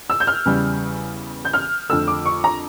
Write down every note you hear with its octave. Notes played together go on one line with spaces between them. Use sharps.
E6
G6
F6
E2 C#3 G3
G6
F6
F2 D3 A3 E6
D6
C#6
A#5